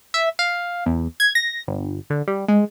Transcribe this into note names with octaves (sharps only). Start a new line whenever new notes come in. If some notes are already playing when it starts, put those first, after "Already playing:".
E5
F5
E2
G#6
A#6
G1
D3
G3
G#3